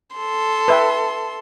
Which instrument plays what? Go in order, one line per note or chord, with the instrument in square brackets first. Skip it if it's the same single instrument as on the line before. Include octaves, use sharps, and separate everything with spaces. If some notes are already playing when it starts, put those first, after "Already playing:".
[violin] A4 C6
[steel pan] B4 E5 G5